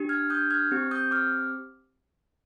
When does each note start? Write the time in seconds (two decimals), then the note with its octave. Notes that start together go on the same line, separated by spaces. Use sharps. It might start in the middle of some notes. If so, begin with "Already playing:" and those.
Already playing: D4 G4
0.09 F6 G#6
0.30 D#6 G6
0.50 F6 G#6
0.71 C4 G4
0.91 D#6 G6
1.11 D6 F6